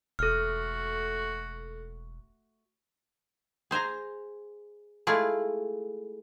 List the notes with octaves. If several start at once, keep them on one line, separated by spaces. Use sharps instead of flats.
E1 A3 F#4 A4 F6
G#4 C5 G#5 A#5
G#3 A3 E4 F4 G#4